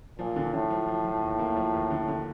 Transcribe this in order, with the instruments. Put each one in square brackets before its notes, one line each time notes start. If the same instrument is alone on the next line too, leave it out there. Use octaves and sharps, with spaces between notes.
[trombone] A#2 [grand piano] F3
[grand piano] D3
[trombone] A2 [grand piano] D3
[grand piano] F3
F3
F3
D#2
A#3
F3
D#2
D3
D3